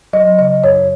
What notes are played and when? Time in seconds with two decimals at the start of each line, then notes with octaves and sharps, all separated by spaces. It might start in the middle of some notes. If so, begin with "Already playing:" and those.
0.13 F#3 D#5
0.38 C#3 D#5
0.64 F#2 C#5